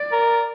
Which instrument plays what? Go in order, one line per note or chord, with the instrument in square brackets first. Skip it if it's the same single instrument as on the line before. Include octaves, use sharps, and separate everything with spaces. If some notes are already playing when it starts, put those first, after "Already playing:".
Already playing: [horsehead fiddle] D5
[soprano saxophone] A#4